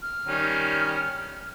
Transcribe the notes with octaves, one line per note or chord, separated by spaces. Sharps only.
F6
D#3 G3 C#4